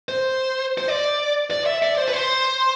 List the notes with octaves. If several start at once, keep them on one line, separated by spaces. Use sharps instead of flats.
C5
C5
D5
D5
E5
D5
C5
B4
C5